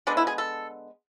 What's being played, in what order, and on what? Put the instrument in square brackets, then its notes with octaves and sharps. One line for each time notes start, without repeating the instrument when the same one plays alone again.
[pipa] D3 G#3 B3 D4
E4
G#4
A4